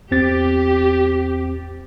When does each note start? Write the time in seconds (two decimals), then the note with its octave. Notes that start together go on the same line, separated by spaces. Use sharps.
0.11 E2 C4 G4 A6